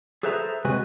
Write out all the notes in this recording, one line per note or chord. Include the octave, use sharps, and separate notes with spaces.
G#4 A4 B4 C5 E5 A#5
C3 G#3 F#4 B4 G#5